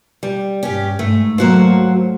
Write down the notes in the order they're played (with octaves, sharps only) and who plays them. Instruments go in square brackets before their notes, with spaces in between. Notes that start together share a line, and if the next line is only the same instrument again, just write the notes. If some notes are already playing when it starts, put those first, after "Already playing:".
[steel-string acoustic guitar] G3
[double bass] G2 [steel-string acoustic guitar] C#4 G4
[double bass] G#2 [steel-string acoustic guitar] A3
[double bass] F#3 A3 [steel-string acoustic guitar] A#3 F#4 C5